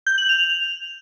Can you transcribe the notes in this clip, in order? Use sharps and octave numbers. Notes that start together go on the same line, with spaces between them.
G6
F#7
F7